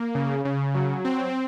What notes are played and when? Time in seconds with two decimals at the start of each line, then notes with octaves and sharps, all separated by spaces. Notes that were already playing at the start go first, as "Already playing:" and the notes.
Already playing: A#3
0.15 C#3
0.45 C#3
0.74 F#3
1.05 C4